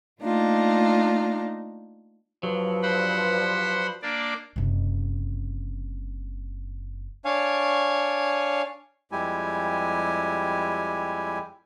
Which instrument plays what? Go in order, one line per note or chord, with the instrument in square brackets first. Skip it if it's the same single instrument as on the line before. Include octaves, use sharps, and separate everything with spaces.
[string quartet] A3 A#3 D4 D#4 F4
[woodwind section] G2 F3 [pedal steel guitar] F#3
[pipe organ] C5 F#5 B5
A#3 D4 D5
[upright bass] F#1 C3
[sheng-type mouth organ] D4 C#5 F5 G#5
[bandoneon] F2 G3 G#3 E4 G4 G#5